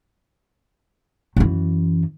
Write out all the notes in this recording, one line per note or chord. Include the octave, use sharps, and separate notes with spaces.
F#2 E3